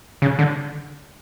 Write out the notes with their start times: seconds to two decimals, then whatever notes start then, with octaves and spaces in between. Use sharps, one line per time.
0.22 C#3
0.39 D3